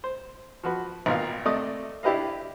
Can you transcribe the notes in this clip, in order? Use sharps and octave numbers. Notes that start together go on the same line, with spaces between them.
C5
F3 F#4 B4
G#1 A#2 B3 F5
C3 A3 D5 D#5 D#6
D4 E4 G4 B4 D#5 F5